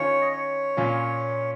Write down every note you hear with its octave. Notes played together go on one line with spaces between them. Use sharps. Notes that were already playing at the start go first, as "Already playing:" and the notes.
Already playing: D#3 C#4 F4 C#5
D#5
C#5
A#2 A#3 C#4 F4